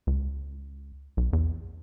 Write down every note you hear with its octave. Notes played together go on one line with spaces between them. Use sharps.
C#2
B1
E2